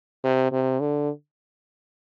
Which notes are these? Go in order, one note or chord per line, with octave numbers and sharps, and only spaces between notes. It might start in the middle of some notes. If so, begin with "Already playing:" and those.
C3
C3
D3